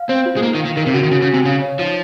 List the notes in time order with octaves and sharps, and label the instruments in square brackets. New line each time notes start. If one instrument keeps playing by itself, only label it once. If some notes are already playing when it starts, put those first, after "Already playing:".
Already playing: [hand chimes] F5
[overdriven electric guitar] C4 [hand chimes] C5
[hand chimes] F4
[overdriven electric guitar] G#3
[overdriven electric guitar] A#3 [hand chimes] D#4
[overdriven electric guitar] D#3
[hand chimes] F5
[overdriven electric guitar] D#3
[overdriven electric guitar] D#3 [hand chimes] A#4
[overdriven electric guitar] C3
[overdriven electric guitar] C#3 [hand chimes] F#4
[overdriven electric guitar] D#3
[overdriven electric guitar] C#3 [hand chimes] F#4
[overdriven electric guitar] C#3
[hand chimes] G#5
[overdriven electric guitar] C3
[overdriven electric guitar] C#3 [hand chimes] F5
[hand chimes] C#5
[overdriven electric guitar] F3 [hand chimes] D#4